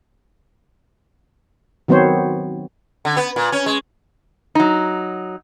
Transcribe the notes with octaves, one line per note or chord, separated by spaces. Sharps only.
D#3 F#3 B3 C4 C5 C#5
D3
B3
A#2
C#4
G#3
F#3 D#4